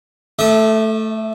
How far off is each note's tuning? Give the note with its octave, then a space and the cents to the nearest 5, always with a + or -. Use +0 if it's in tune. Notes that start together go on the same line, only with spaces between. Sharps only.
A3 +0 E5 -40 D6 +35